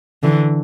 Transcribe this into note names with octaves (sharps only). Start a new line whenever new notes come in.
D3 E3